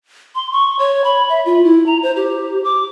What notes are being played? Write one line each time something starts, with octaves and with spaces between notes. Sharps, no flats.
C6
C#6
C#5
B5
E5
F4
E4
A#5
C5
G4
D6